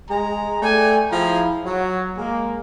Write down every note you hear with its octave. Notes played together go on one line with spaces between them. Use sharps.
G#3 A#5
A3 D5 G5 G#5
F3 E4 G#4 G5 A#5
F#3
G#3 A#3